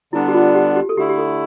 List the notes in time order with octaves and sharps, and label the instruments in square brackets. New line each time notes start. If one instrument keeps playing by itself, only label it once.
[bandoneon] D3 G3 B3 D4 [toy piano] E4
[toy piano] G4
F4
G4
G4
A4
[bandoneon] D3 A3 E4 [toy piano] G4
[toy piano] G4
A4